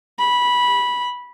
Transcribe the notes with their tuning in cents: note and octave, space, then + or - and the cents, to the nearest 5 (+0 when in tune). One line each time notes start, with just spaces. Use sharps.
B5 -15